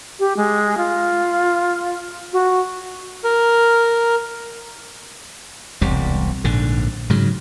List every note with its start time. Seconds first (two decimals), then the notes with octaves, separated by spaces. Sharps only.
0.19 G4
0.37 G#3
0.77 F4
2.33 F#4
3.24 A#4
5.81 E1 C2 G3
6.44 A#1 G#2 D3
7.10 G#2 C#3 F#3